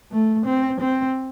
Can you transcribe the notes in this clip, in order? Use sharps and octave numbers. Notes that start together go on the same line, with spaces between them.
A3
C4
C4